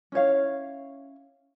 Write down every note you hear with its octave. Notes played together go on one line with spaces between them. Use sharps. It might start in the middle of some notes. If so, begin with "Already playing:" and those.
C#4 E4 C#5 F5